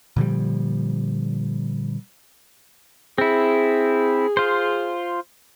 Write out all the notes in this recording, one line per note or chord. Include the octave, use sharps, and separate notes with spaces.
A#2 D3 F3 G3
C4 E4 G#4
F4 C5